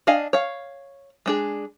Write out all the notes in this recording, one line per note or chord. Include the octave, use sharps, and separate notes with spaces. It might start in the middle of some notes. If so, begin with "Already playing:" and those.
D4 D#5 F5 G#5
C#5 F5
G#3 D4 G#4